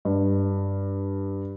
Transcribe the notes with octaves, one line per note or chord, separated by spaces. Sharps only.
G2